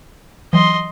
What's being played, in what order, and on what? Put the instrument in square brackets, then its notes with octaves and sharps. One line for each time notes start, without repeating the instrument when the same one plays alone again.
[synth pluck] E3 F#3 [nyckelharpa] D#5 C6